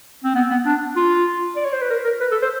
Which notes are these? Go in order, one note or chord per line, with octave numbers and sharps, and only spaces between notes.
C4
B3
B3
D4
F4
D5
C#5
C5
B4
A#4
A#4
B4
A4
C5